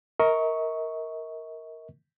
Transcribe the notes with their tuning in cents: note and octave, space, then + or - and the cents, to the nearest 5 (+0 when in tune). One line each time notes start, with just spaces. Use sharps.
A#4 +0 D#5 +45 C#6 +0